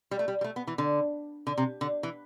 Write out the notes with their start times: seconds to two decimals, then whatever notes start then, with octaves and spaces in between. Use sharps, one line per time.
0.11 G3
0.19 A3
0.28 G3
0.41 G3
0.44 A3
0.56 B3
0.67 E3
0.78 D3
1.47 D3
1.58 C3
1.81 D3
2.03 E3